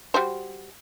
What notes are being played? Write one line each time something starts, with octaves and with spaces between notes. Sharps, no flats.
G3 F#4 C5